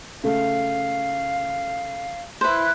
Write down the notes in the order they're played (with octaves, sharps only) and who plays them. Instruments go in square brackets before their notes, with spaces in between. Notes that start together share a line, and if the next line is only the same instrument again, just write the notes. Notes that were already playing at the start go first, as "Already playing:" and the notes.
[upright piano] C#3 A3 [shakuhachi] F5
[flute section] E4 F#6 [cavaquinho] B4 C5